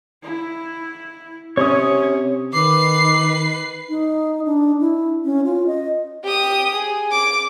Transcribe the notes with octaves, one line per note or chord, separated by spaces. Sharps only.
E4
C3 C#4 C#5 C#6 D#6
D#3 B4 D6 C7
D#4
D4
E4
C#4
F4
D#5
G4 D#6
G#4
D6